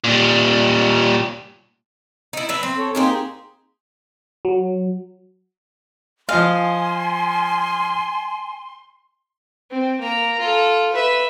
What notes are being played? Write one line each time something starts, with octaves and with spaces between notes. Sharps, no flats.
A#2 G3
D#4 E4
F#3 B4 E5
C4
A4 C#5
A#3 C4 D#4 G4 G#4 C5
F#3
F3 D#5 F5 G#5 C6 F6
C4
A#3 A#5
F4 A4
B4 E5